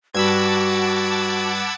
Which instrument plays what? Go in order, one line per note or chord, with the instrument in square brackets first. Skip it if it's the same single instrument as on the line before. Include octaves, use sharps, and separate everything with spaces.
[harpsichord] G2 [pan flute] F#4 [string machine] F#5 A5 D6 [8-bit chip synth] B5 E6 G#6